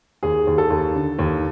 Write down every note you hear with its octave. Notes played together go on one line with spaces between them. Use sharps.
D#2 G#4
D#2
A4
D#2
D3
D#2